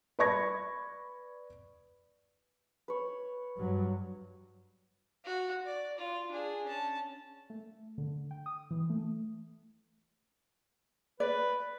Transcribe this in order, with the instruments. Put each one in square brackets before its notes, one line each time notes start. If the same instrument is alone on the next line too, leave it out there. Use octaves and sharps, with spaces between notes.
[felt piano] B4 D5 B5 C#6 G#6 A#6
[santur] B4 C#5
[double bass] G2 F#3
[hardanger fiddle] F#4
D5
F4
D4 G#4
C#4 A5
[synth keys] A3
D3
G5
D#6
E3
A3
[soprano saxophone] B4 [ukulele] D5